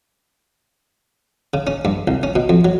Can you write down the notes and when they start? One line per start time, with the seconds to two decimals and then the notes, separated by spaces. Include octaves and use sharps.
1.54 C#3
1.67 C#4
1.85 G2
2.08 C2
2.23 C#4
2.36 B2
2.49 F2
2.65 F#3